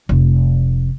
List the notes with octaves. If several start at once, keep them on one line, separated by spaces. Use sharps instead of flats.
F1